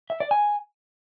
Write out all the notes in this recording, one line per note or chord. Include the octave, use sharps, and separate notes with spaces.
E5
D5
G#5